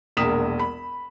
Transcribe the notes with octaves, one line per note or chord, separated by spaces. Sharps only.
E1 A#1 A#3 D#6 B6 E7
B5